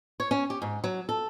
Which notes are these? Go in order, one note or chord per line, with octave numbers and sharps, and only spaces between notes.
C#5
C#4
G4
G#2
F#3
A4